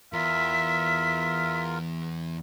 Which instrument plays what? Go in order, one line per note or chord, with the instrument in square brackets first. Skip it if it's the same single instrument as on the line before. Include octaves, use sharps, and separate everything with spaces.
[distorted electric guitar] E2 [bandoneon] F4 A#4 [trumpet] E5 [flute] B6